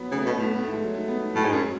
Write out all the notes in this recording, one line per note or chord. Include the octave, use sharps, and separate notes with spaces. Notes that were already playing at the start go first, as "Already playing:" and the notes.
Already playing: F#3 B3
C#3 A3
B3
B2
A3
A2 B3
B3
A3
G#3
F#3
A3
B3
A3
A2 F#3
G#2
F#2 G#3